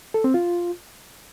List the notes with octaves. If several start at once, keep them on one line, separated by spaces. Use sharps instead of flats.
A4
C4
F4